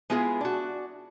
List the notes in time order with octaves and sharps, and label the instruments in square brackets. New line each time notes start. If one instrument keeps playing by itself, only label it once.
[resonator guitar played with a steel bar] G#3 B3 E4 F4 G#4
D4 F#4